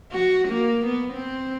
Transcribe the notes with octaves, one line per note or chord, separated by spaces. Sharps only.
F#4
A#3
B3
C4